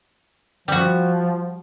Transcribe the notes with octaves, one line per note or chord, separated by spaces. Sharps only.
F3 G3 F#4